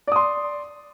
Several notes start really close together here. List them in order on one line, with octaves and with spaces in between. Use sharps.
D5 D#6 C6